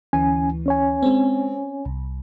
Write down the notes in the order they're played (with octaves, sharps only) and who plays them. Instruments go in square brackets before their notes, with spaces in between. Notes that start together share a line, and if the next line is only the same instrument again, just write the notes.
[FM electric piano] D2 E3 [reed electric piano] C#4 G#5
[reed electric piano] C#4 C#5 G#5
[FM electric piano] G#3 C4
C2